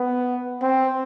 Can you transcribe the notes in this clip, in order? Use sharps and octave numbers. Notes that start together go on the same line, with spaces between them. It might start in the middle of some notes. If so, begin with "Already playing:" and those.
Already playing: B3
C4